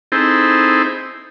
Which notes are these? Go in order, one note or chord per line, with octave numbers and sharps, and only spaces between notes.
C4 D#4 E4 G#4 A4 C5